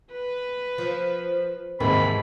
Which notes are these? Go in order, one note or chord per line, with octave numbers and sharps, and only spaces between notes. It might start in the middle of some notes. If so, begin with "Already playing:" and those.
B4
F3
D#2 G#2 C3 E3 A#3 B5